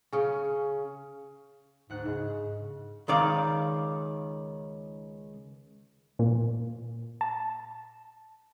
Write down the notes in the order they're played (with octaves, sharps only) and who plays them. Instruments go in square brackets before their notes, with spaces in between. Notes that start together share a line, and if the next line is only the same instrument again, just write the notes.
[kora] C#3 C#4
[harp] D2 F#5 F#6 [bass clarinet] G#2
[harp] G#2 [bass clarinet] C#3
[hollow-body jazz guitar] C#2 D#3 D5 F5
[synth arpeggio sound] A#2
A5